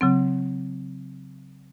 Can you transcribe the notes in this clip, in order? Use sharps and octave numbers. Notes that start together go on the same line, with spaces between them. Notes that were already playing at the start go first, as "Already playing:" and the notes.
C#3 F#3 C4